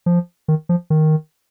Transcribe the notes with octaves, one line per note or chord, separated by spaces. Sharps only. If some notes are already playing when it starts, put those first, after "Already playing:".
F3
D#3
F3
D#3